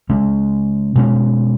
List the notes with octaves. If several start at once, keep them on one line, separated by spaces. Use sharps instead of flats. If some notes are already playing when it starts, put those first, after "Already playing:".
C#3 G#3 C#4
B2 G#3 C#4